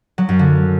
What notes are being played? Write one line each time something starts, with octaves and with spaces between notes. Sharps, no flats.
F#3
F#2
D3